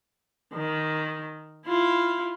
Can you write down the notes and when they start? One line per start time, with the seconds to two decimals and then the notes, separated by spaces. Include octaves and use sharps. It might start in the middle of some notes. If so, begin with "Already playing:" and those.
0.54 D#3
1.67 E4 F4